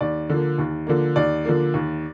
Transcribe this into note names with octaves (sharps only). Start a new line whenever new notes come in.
D#2 D5
D3 F3 A#3
D#2
D3 F3 A#3
D#2 D5
D3 F3 A#3
D#2